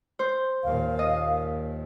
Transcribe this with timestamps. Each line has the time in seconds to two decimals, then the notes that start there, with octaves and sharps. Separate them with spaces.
0.19 C5
0.64 D#2 A#2 F5
0.99 D#5